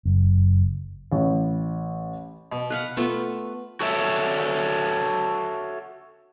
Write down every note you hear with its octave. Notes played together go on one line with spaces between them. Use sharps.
F#1
A1
B2
B4 F5 F#5
A3 B3 F4 B4
F#4 A4 C#5 E5